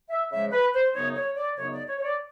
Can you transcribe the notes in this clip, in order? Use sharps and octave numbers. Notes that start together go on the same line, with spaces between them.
E5
C#3 F3 G#3 E5
B4
C5
F#2 C#3 F#3 B3 D#4 C#5
C#5
D5
F#2 C#3 F#3 B3 D#4 C#5
D5
C#5
C#5
D5